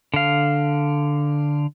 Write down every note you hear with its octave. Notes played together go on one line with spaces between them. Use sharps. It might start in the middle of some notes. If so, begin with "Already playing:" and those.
D3 F5